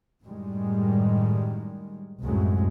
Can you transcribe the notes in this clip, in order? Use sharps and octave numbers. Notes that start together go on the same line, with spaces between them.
F#2 A2 D#3 G3 G#3
C2 F#2 A2 F#3 G#3 A3